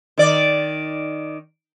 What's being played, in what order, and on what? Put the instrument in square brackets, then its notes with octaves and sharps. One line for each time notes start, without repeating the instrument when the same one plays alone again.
[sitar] D#3 D5